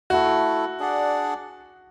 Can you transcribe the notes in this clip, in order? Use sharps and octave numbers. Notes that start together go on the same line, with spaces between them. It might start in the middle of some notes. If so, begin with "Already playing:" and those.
A3 E4 F#4 A4
D4 G#4 D5 F#5